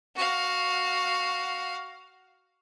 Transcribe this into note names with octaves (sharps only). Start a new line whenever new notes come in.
F#4 F5